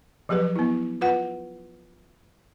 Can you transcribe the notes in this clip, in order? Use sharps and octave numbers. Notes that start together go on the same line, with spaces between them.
F3 F#3 G4 G#4 B4
B3 E4
F4 B4 F#5